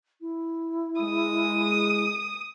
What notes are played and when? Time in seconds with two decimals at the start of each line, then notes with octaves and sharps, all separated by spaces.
0.21 E4
1.01 G#3 D#6